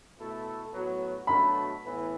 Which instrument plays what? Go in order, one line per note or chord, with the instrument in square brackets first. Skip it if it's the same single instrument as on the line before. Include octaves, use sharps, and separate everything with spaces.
[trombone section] B2 A3 E4 A4
A2 F#3 B3 F#4
[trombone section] B2 F#3 A3 D4 F#4 [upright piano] B5
[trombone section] A2 E3 B3 E4